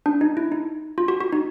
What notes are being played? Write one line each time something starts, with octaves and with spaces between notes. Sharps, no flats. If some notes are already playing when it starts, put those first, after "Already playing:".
D4
D#4
E4
D#4
F4
F#4
F#4
D#4